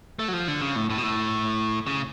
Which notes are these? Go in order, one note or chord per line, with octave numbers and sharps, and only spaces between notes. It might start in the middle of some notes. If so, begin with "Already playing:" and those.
A3
F#3
F3
D3
C#3
A2
A2
B2
A2
C#3